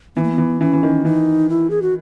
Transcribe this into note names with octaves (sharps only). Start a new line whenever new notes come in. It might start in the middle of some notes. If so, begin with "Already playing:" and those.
E3 B3
A#3
B3
E3
E3 C#4
E3
D#3
E3 D#4
E4
G#4
F#4